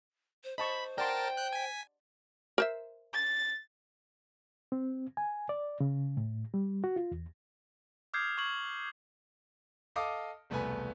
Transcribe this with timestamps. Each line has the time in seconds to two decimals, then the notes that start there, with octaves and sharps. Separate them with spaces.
0.44 C5
0.58 C5 D#5 A5 B5 C#6
0.98 A#4 D5 F#5 G5 A5 C6
1.37 F#6 G6
1.53 G#5 B6
2.58 A#4 C5 E5
3.13 A6
4.72 C4
5.17 G#5
5.49 D5
5.80 C#3
6.17 A2
6.54 G3
6.84 F#4
6.96 F4
7.12 E2
8.14 D6 D#6 F6 G6 G#6 C7
8.38 C#6 F6 G#6 F#7
9.96 A4 D#5 F5 D6 D#6
10.50 E1 C2 A3 B3 B4 G#5